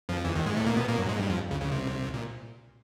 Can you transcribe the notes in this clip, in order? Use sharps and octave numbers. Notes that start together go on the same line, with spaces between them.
F2 F3
E2 E3
D#2 D#3
G#2 G#3
A2 A3
A#2 A#3
B2 B3
A#2 A#3
F#2 F#3
G#2 G#3
G2 G3
F2 F3
C#2 C#3
C#2 C#3
C2 C3
A#2